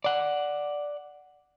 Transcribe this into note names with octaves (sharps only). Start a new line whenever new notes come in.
D5 F#5